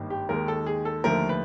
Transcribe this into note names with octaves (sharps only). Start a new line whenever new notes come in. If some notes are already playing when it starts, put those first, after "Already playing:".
Already playing: G#1 G2 D#3 G3 A#3
G4
D#2 D#3 G#3 A#4
A4
G#4
A4
D#2 D3 F3 A3 A#4
B4